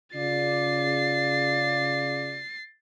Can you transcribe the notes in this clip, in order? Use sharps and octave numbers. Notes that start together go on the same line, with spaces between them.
C#3 F4 D5 A6 C7